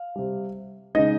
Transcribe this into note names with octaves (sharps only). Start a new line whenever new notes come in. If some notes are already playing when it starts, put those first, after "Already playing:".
Already playing: F5
C3 G3
C#3 G#3 D#4 D#5